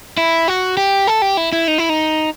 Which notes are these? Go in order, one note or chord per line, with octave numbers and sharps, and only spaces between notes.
E4
F#4
G4
A4
G4
E4
E4
D#4
E4
D#4